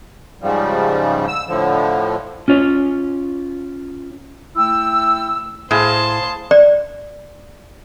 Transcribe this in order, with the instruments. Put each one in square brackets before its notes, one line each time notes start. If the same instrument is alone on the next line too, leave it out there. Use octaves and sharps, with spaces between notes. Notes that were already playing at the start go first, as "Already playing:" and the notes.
[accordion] G#2 C#3 F3 G3
E6
A2 D3 F3
[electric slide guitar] C#4 F4 C#5
[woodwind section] A3 E4 G5 E6
[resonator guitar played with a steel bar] A2 [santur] G#4 F5 [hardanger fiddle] C5 A5
[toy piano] D5